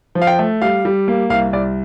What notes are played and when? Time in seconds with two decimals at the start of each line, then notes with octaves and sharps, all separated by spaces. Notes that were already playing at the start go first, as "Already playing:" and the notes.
0.15 F3
0.22 F5
0.27 G5
0.39 A3
0.62 G3 F5
0.85 G3
1.08 A#3
1.30 C2 F5
1.53 C2 D5